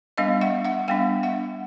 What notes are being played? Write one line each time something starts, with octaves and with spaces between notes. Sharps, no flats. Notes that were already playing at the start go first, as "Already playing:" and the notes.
G3 B3 D4 D#5 F5
E5 F#5
E5 F#5
G3 B3 D4 F5 G5
E5 F#5